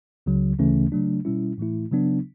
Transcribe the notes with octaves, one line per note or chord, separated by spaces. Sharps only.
C#2 C#3 F#3
D2 C#3 E3 A3 C#4
C#3 F#3 A3 D4
B2 G3 C#4 E4
A2 E3 A3 E4
C#3 F#3 B3 D4